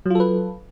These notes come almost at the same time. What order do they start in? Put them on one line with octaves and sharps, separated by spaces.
F#3 F4 A4 B4